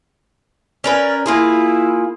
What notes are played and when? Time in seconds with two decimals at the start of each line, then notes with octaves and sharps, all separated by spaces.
0.84 C#4 A#4 B4 D5
1.26 A#3 E4 F4 G#4